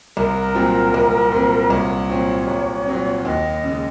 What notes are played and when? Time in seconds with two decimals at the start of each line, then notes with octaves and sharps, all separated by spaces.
0.16 C2 A#4
0.55 A#2 F#3 C4
0.94 C2
1.32 A#2 F#3 C4
1.70 C2 C#5
2.09 A#2 F#3 C4
2.48 C2
2.86 A#2 F#3 C4
3.25 D#2 D#5
3.64 C#3 G#3